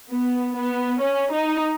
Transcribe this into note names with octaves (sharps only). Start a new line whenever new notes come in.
B3
B3
C#4
D#4